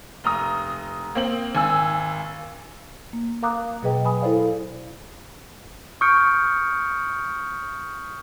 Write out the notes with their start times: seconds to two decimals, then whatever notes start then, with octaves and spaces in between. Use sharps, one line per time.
0.24 F1 A#5 D#6
1.15 A#3 C4 F#7
1.55 G#1 G#5 E6
3.13 A#3
3.42 A#4 F5 A#5 D6 D#6 F#6
3.82 B2 F#3 G#4 B4 D#5 G5
4.05 G#5 B5 D#6
4.22 E4 A4 C5 D5 F5
6.01 C#6 D#6 F6 G6 C#7 D7